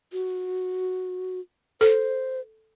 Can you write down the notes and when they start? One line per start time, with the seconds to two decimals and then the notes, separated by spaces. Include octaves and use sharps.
0.13 F#4
1.81 A4 C5